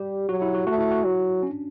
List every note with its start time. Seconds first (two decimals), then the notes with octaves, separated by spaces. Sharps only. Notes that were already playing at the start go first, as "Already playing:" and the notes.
Already playing: G3 G4
0.29 F#3 F#4
0.42 E4
0.55 F#4
0.67 A3 F#4
0.78 E4
0.91 F#4
1.05 F#3
1.43 C#4
1.50 D4